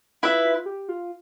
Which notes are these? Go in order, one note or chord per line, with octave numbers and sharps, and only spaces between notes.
E4 F4 B4 E5
F4
G4
F4